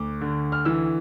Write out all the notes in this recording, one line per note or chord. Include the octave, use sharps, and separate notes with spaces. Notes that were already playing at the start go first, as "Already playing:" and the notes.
Already playing: D2 D6
D3
F6
E3 E6